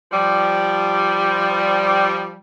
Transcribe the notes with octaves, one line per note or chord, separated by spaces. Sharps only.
F3 G3